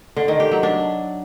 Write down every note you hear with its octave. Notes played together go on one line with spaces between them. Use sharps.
D3
D#3
G4
F#3
D4